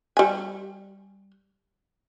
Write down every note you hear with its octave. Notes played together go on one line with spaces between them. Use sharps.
G3 G#5